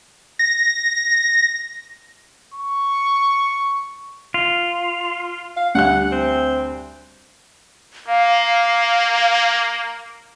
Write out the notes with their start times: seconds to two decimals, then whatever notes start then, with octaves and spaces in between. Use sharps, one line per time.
0.39 A#6
2.54 C#6
4.34 F4
5.57 F5
5.75 D2 G3 F#5 F#6
6.12 C4
8.08 A#3 F5